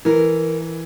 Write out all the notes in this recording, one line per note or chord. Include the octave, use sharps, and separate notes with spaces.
E3 A#4